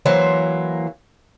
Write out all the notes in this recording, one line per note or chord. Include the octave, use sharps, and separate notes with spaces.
E3 F#3 A#3 C5